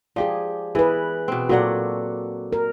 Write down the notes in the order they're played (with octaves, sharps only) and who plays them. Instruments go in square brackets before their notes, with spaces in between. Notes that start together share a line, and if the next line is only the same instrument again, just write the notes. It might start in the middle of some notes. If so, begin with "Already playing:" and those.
[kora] F3 G4 [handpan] G#4 D5
[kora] E3 [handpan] G#4 B4
[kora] B2 C4
[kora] A#2 F#3 F#5 [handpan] F#4 A4 D5
[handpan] A#4